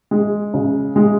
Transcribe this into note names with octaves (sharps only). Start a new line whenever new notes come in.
G#3
C#3
G#3